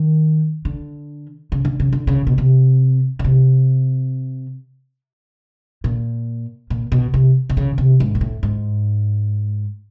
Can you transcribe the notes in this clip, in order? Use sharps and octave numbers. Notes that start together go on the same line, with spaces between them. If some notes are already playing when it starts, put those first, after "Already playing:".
Already playing: D#3
D3
C#3
D3
C#3
D3
C#3
B2
C3
C#3
C3
A#2
A#2
B2
C3
C3
C#3
C3
G#2
A#2
A2
G#2